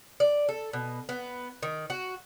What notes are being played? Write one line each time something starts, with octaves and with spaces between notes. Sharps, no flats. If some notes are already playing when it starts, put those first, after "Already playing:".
D5
A4
B2
B3
D#3
F#4